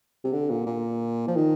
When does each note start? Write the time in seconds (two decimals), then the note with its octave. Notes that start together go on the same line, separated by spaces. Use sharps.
0.24 C3
0.33 D3
0.50 A#2
0.66 A#2
1.28 F3
1.36 D#3